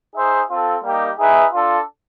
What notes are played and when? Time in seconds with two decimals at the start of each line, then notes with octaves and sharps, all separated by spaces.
0.14 D#4 G#4 C5 E5
0.49 C4 F4 A4
0.83 G3 A#3 D#4 G4
1.18 D#4 G#4 B4 E5
1.53 D4 F4 A4